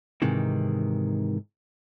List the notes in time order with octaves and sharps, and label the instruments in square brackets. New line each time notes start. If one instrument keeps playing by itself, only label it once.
[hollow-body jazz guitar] G#2 C3 D#3 E3